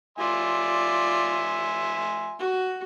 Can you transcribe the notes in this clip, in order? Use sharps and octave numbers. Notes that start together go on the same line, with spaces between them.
F4 D5 E5 G#5 C6
F#4